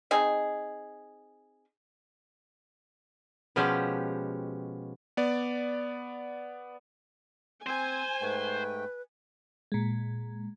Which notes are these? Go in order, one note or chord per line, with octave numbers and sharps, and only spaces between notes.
C4 D#4 G#4
B2 F3 G#3 C#4 G4
B3 D5
C4 C5 G#5
G#2 A3 B4 G5
A#2 G#3